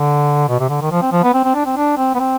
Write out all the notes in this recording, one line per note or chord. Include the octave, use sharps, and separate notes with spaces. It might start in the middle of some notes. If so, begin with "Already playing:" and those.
Already playing: D3
B2
C3
D3
D#3
F3
C4
F3
B3
C4
C4
D4
C4
D4
C4
B3
C4